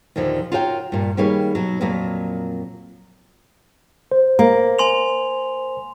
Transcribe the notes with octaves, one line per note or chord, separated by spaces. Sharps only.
D#2 A#2 D3 F3
F4 F#4 A#4 C#5 F#5 G5
G2 A#2
D#3 G3 A#3 G#4 B4 C#5
B2 F#3
F2 A#2 F#3 A#3 B3
C5
A#3
G#5 C6 F7